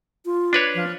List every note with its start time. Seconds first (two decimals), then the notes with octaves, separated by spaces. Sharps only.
0.25 F4
0.53 D4 B4 C#5
0.74 F3